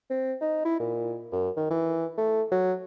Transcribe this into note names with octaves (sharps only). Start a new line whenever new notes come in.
C4
D#4
E4
A#2
F#2
D#3
E3
A3
F#3